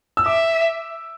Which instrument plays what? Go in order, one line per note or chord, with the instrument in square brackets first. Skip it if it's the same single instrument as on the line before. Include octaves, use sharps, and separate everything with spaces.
[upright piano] E6
[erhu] E5 [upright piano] D6